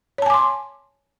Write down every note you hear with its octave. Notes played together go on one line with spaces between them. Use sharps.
C#5 G#5 A5 C6 D6